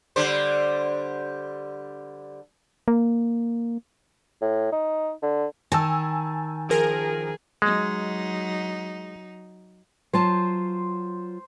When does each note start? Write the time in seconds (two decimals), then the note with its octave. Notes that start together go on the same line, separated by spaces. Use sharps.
0.16 D3 G3 C5
2.88 A#3
4.41 A2
4.72 D#4
5.22 D3
5.72 D#3 G#5 A5 E6
6.70 F3 G#4 A#4
7.62 F#3 G#3 D#4
10.13 F#3 F4 C5 A5